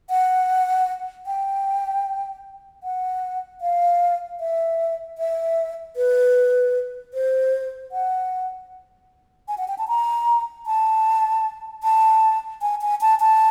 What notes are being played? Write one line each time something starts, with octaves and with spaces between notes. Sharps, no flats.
F#5
G5
F#5
F5
E5
E5
B4
C5
F#5
G#5
F#5
G5
A5
A#5
A5
A5
G#5
G#5
A5
A5